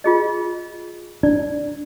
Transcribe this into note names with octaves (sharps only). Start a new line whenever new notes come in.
F4 G#4 D#5
D4 D5